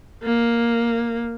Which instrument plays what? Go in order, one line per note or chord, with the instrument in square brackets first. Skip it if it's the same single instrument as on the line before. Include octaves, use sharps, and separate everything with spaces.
[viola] A#3